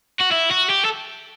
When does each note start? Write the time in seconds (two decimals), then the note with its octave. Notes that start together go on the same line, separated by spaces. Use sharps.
0.21 F#4
0.32 E4
0.52 F#4
0.70 G4
0.85 A4